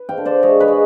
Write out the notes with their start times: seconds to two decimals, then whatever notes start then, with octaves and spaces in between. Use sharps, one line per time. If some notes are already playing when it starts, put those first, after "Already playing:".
Already playing: B4
0.09 F5 G5
0.18 D3
0.25 C5 D5
0.43 G#3 C#5 D#5
0.60 B4 C#5
0.68 G#3